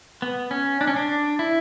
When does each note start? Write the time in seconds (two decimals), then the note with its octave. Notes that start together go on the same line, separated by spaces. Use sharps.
0.22 B3
0.51 C#4
0.81 D4
0.87 C#4
0.96 D4
1.39 E4